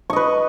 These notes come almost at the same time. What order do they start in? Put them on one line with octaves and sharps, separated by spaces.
C#6 D#5 B4